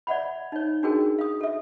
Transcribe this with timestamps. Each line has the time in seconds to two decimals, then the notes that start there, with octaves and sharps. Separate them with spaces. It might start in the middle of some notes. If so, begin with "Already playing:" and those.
0.07 D5 E5 F#5 B5
0.52 D#4 C#5
0.83 D4 D#4 F#4 G#4 A#4 G5
1.18 F5 D#6
1.41 A4 E5